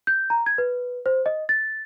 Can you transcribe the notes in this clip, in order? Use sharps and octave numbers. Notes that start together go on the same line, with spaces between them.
G6
A#5
G#6
B4
C5
D#5
A6